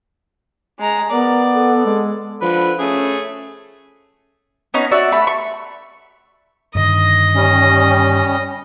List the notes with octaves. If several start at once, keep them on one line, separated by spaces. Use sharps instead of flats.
G#3 A#5
B3 A#4 D5
A4
G#3
D3 F3 B4
A3 C#4 G#4
B3 C#4 D#4 D#5
F#4 D5 E5 E6
A3 B5
C#6
G2 D3 D#3 D#5
G3 C#4